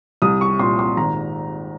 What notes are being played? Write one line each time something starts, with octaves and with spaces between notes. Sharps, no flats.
C2 D#6
C#6
A#2 C6
C6
G#1 A#5